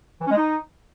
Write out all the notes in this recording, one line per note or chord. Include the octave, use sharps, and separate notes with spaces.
E3
C#4
G#3
D#4